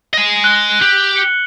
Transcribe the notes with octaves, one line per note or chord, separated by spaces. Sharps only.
D#5 G#5
F#6 G7
G4 F#7
C#7